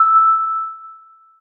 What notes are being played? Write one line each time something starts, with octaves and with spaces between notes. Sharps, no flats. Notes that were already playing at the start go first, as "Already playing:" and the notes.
Already playing: E6